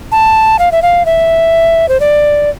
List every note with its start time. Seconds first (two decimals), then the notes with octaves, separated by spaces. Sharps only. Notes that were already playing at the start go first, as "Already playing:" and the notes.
0.12 A5
0.59 F5
0.72 E5
0.82 F5
1.06 E5
1.89 C5
2.00 D5